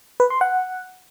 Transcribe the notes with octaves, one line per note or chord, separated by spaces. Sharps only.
B4
C6
F#5